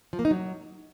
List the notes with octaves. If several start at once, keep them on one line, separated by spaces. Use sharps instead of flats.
F3
A#3
D#4
F#3